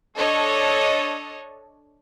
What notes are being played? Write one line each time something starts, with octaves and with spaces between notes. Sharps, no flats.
D4 A4 C#5 D#5